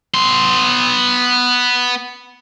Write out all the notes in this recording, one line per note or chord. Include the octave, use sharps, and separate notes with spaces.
B3 C6